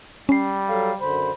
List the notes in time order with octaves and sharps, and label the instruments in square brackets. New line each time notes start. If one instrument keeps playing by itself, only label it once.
[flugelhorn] G3 [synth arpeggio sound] C#4 C7
[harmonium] F#3 F5 [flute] A4
[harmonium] F#2 D3 C5 [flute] B5